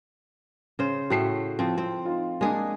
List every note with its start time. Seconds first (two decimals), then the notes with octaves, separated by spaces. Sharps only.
0.79 C#3 C5
1.10 A2 A3 F#4 G5 C7
1.59 F3 C4
1.78 C4
2.05 D#4 F4
2.41 G#3 A#3 D4 G#4 A5